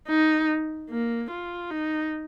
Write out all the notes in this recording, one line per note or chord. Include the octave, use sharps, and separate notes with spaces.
D#4
A#3
F4
D#4